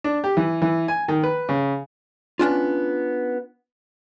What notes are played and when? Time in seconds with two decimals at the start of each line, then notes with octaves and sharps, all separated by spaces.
0.04 D4
0.24 G4
0.37 E3
0.62 E3
0.88 G#5
1.08 D#3
1.24 B4
1.49 C#3
2.39 B3 C#4 D4 F4